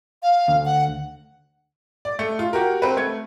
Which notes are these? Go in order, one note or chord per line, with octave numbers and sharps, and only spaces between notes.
F5
D2
F#5
D5
A3
F4
F#4 G4 A#4
C4 A#4 B4
A3 G#6